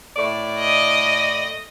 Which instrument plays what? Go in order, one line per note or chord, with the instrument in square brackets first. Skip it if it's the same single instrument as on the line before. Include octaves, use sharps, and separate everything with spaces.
[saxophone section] A2 A3 D5
[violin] D#5